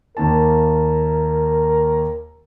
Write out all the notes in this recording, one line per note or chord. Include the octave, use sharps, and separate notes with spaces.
D#2 A#3 A#4 A5